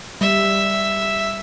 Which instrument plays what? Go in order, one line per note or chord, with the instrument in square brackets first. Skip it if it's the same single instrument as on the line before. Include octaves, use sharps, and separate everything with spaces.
[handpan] G3 [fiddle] E5